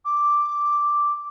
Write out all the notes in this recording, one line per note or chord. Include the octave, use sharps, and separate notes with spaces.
D6